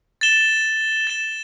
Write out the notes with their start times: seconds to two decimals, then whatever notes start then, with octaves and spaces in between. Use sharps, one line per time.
0.21 A6 E7 G7
1.07 A6 E7 G7